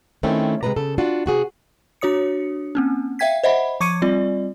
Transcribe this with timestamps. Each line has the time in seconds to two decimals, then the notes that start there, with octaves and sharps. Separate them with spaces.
0.23 D#3 A3 C4 C#4 E4
0.63 C3 G#3 A#3 D4 B4 A#5
0.76 C#3 A4
0.98 D4 F4 F#4
1.26 C3 F#4 G#4
2.01 D4 F#4 C#5 D#6 C#7
2.75 A#3 C4 C#4
3.19 E5 F5 G5 G#6 B6
3.44 C5 D#5 E5 F#5 B5
3.80 F3 C#6 D6 G#6 C#7 D#7
4.02 G3 C4 F4 D5